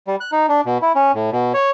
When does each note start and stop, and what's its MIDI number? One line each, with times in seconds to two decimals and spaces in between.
0.07 0.16 55
0.20 0.31 90
0.32 0.46 63
0.49 0.61 62
0.66 0.78 47
0.82 0.92 64
0.95 1.12 61
1.14 1.30 45
1.33 1.53 47
1.54 1.71 73